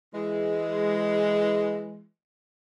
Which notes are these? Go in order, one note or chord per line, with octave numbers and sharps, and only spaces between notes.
E3 G#3